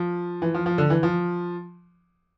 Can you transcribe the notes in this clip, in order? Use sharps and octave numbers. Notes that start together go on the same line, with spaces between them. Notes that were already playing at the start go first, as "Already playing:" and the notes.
Already playing: F3
E3
F3
F3
D3
E3
F3